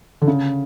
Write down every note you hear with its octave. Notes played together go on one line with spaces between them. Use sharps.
D3
C#3